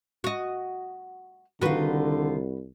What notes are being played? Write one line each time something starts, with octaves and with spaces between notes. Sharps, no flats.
F#4 D#5
C2 D3 D#3 F4 F#4 B4